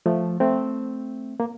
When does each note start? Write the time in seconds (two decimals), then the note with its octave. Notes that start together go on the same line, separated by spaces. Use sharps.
0.06 F3 A3
0.40 A3 C4
1.40 A#3